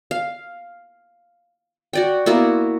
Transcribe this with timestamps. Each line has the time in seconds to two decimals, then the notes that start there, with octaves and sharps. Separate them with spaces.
0.11 F5
1.93 F#4 D5 G5
2.26 A#3 B3 E4 F#4